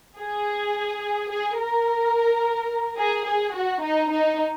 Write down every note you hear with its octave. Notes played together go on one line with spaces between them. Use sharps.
G#4
G#4
A#4
G#4
G#4
F#4
D#4
D#4